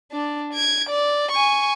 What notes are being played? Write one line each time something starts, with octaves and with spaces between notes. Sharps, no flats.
D4 D5
G#6 D7
D5
G#5 C#6